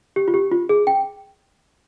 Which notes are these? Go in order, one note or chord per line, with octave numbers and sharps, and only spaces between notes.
G4
F4
G4
F4
G#4
G5